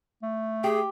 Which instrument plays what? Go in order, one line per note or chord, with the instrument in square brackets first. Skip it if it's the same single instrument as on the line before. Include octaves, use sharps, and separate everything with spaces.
[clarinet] A3
[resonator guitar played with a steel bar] G4 [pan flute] G#4